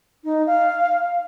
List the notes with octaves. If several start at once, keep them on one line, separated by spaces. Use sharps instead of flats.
D#4
F5